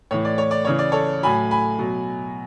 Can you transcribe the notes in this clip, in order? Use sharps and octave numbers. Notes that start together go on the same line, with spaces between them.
A2 E3 C#5
D5
C#5
D5
C#3 E3 C#5
D5
A4 C#5
A2 F#3 G#5 B5
G#5 B5
B2 F#3